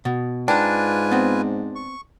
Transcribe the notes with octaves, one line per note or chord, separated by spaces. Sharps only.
B2
G#2 D4 F4 B4 G5 G#5 A#5
B3 C4
C#6